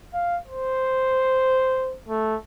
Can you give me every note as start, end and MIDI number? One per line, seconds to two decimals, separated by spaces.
0.13 0.38 77
0.47 1.94 72
2.08 2.36 57